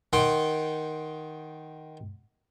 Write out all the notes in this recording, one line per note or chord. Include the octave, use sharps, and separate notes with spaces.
D#3 F#5 G5 C6